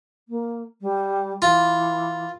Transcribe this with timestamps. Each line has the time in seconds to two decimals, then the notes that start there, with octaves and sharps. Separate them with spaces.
0.28 A#3
0.81 G3
1.42 E3 F4